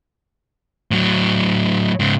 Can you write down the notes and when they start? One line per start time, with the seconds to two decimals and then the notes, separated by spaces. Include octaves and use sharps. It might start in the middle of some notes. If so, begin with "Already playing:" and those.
0.91 A2 F#3
2.00 G#2 C#3